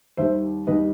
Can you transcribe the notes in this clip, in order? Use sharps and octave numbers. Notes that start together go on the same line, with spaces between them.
D#2 D#3 G3 C5 E5
D#2 D#3 G3 B4 D#5